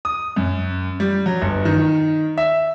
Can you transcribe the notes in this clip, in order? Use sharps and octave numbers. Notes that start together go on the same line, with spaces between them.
D#6
F#2
G3
F#3
G1
D#3
E5